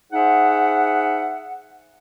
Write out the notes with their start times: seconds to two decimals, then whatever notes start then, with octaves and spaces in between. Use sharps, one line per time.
0.12 D#4 G#4 C5 E5 F#5